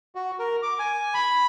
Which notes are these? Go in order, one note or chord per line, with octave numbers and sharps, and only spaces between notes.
F#4
A#4
D6
G#5
B5